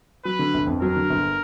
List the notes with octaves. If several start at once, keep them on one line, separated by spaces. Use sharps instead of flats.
F#3 B4
D3
G1
F2
F#3 A#4
D3
G1